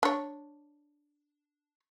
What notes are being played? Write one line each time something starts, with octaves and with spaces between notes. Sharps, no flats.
D4 C#5